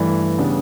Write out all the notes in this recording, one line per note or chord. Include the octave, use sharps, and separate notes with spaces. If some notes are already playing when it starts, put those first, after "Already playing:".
Already playing: G2 E3 A3 D5
C#3 G3 B3 D4